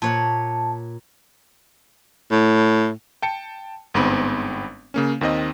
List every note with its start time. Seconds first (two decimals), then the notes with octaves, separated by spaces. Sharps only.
0.02 A#2 C#5 F#5 A5
2.31 A2
3.22 G5 A5 C#7
3.94 G1 G#2 B3 C4 B5
4.94 C#3 A#3 C#4
5.21 D#2 D#3 C4 D#5